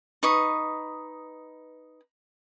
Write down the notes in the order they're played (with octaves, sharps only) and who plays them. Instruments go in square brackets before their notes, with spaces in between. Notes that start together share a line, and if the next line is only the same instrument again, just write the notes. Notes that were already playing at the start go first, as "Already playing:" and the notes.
[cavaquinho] D#4 B4 C#6 D#6